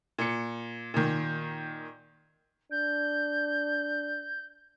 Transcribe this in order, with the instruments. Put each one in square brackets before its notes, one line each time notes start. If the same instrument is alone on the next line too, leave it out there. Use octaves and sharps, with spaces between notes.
[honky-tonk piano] A#2 C#7
A#2 D#3
[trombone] D4 [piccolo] G6